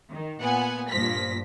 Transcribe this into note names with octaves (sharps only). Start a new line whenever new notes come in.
D#3
A#2 B3 F#5 G#5
G2 A#2 F3 A#6 B6